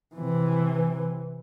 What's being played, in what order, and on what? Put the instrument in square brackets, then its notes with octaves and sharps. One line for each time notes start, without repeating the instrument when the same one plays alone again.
[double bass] C3 E3